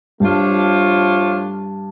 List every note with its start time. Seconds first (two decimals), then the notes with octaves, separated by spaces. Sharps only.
0.20 G2 F3 A3 D4 F4 C#5